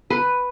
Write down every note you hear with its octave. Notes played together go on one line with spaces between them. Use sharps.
B4